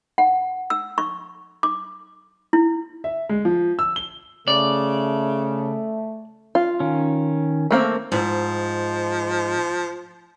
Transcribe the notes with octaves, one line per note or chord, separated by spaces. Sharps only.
F#5
E6
C#6
D6
E4
E5
G#3
F3
E6
G7
C#3 A3 D5
F4
D#3 C#4
A3 A#3 C4
G#2 F3